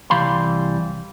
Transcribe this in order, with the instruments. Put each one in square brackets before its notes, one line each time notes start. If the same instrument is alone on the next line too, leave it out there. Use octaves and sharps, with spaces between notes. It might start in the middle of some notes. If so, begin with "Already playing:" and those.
[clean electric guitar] C2 E3 G3 F5 B5 C6